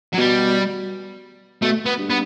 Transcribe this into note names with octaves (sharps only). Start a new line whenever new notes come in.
F#3
B2 G3
B2 A3
B3
G2
B3